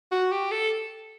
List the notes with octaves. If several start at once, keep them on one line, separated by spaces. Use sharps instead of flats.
F#4
G4
A4